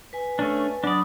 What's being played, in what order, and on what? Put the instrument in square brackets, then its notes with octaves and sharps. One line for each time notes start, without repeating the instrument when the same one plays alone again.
[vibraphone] B4 G#5
[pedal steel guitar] A3 C#4 D4
[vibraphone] F#3 B5 D#6 [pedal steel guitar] D4 D5